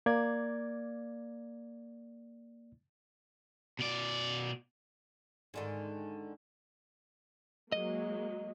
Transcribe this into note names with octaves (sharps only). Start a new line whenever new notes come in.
A#3 D5 G#6
B2 D5
G#2 D3 D#3
F#3 G#3 A#3 D#5